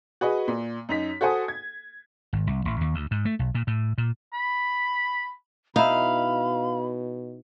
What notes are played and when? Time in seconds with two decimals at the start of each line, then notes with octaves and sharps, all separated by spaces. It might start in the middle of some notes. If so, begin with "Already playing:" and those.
0.21 F#4 G#4 B4 D#5
0.48 A#2
0.89 F#2 D#4 B6
1.21 F#4 A4 C5 F#5 G#5 D#6
1.48 G#6
2.33 G#1
2.47 C2
2.65 A1
2.81 D#2
2.94 D2
3.11 G#2
3.25 A3
3.39 B1
3.55 A#2
3.67 A2
3.98 A#2
4.33 B5
5.76 B2 D#4 E4 F5 B5